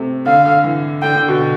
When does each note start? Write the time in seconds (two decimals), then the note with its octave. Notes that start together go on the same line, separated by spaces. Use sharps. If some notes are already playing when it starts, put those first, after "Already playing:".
Already playing: C3 A3
0.26 D3 F5
0.45 D3
0.64 E3
1.02 D3 G5
1.15 D3
1.28 B2